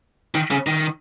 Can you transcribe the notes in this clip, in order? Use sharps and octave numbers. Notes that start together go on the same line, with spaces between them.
D#3
C#3
D#3